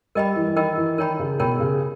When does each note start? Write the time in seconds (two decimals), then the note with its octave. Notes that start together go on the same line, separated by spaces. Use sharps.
0.15 G3 A#4 D#5 G5 B5
0.36 E3
0.47 E3
0.56 D#3 A#4 D#5 G5 B5
0.77 E3
0.98 D#3 A#4 C#5 G5 B5
1.19 C#3
1.40 B2 A#4 C#5 G5 B5
1.60 C#3